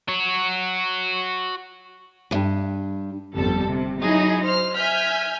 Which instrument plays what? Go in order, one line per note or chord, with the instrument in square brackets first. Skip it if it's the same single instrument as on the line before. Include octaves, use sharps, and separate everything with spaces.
[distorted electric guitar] F#4 C#5
[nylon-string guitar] E2 G2
[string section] G1 F2 G3 A4
C3
F#3 D#4 E4 G#4
C5 F6
E5 G#5 F6 G6 B6